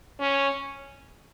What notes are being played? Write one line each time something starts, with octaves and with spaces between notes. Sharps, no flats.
C#4